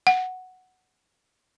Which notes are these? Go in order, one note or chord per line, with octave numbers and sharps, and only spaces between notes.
F#5